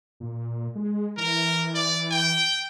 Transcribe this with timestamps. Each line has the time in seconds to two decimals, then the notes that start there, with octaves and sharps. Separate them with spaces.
0.20 A#2
0.75 G#3
1.17 E3 A#4
1.75 D5
2.11 G5